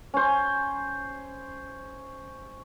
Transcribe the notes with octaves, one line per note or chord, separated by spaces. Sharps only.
C#4 C5